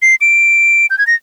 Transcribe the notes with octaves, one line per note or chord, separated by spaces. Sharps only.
C7
D7
G6
G#6
A#6